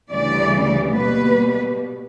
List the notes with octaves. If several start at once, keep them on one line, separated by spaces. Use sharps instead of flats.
D2 C#3 E3 G3 D5
B2 G3 A#3 B4